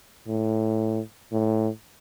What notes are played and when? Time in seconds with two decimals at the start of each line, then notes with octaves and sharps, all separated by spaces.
0.27 A2
1.32 A2